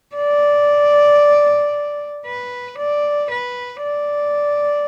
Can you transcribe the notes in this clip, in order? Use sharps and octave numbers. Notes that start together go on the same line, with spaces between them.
D5
B4
D5
B4
D5